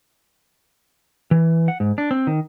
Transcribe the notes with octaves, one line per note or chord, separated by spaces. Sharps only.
E3
F#5
G#2
D4
C4
D#3